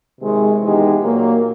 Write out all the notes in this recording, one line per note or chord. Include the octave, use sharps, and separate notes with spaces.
C3 D#3 G#3
E3 G#3 B3 D#4 G4
A#2 F#3 A#3